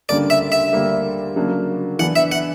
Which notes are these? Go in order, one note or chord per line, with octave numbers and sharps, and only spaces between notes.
D2 C#3 G3 A#3 D4 D5
E5
E5
D2 D3 G3 A#3
C#3 F#3 A#3 D4
E3 B3 D4 F#5
E5
F#5